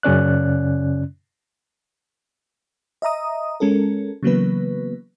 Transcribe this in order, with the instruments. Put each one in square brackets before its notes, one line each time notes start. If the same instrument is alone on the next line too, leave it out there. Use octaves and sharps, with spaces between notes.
[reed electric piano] F#2 C#3 C#4 D5 F#6
[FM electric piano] D#5 E5 A#5 D#6
G#3 C#4 A4 A#4
C#3 E3 F#3 A#3 B3 B4